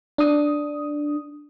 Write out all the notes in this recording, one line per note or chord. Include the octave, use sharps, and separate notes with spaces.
D4 D#6